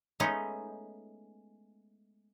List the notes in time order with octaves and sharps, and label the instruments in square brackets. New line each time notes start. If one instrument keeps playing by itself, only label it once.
[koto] G#3 A3 B3 C#4 D#4